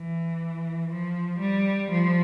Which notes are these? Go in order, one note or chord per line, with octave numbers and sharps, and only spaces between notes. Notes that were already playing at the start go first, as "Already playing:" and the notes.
Already playing: E3
F3
G3
F3